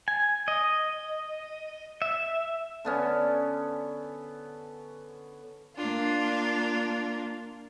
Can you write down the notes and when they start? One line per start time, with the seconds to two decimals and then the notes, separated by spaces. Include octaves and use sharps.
0.08 G#5
0.48 D#5
2.02 E5
2.85 D3 B3 C#4
5.76 A#3 D4 F4